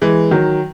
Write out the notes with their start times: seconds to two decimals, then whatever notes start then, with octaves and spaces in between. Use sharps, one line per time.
0.02 E3 G#3
0.31 D#3 F#3